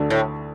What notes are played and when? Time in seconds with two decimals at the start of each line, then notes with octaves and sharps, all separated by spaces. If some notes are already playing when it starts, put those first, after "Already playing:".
Already playing: D2 D3 A3 D4
0.10 A2